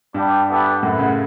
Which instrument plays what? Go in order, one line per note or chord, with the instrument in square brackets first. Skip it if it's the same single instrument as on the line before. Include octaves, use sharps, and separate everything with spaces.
[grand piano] G2 [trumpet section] G3 B3 D4 G4
[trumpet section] B3 E4 A4 D5 G5
[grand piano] F#2 A2 [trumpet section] E4 B4 F#5
[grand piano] A2 C#3